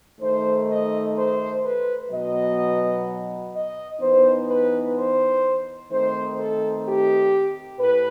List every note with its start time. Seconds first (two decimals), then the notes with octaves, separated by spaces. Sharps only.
0.19 D#3 A3 D#4 C5
0.67 D#5
1.14 C5
1.61 B4
2.09 B2 F#3 B3 D#4 D#5
3.52 D#5
3.99 E3 B3 D#4 C5
4.47 B4
4.94 C5
5.90 D#3 A3 C4 D#4 C5
6.37 A4
6.84 G4
7.79 A2 B4